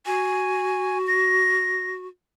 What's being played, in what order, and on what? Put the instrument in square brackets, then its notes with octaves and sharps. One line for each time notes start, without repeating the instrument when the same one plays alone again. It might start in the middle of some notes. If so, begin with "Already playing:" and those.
[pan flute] F#4 [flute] G#5
[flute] A#6